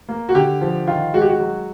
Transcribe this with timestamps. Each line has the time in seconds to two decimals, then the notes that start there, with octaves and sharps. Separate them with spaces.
0.09 A#3
0.29 F#4
0.34 D3 G4
0.61 F3
0.87 D#3 F4
1.13 G#3 F#4
1.21 G4
1.29 F#4
1.40 F#3